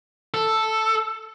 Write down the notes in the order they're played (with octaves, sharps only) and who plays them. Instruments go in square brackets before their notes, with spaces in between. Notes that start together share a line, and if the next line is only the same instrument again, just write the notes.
[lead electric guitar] A4